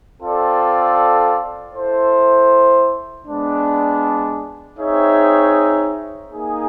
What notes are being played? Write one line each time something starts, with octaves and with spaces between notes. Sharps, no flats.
C4 F4 A4 D5
E4 A4 C5
G#3 B3 D4
C4 D#4 G#4 C#5 E5
A#3 D#4 G#4